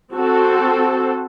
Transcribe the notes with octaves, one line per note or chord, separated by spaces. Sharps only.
C4 F#4 A4